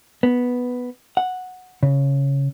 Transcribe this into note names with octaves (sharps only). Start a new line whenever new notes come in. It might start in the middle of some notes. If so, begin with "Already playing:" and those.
B3
F#5
C#3